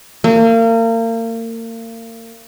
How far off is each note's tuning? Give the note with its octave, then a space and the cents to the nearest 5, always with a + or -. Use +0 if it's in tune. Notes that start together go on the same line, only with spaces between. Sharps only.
A#3 -35